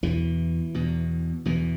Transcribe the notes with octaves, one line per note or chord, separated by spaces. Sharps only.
E2 B2 E3
E2 B2
E2 B2 E3